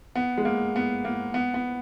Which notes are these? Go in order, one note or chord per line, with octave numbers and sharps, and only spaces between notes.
B3
G#3
A#3
B3
A#3
B3
B3